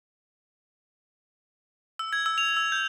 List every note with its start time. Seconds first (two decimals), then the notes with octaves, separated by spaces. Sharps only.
1.99 E6
2.13 G#6
2.26 E6
2.38 F7
2.57 E6
2.72 G6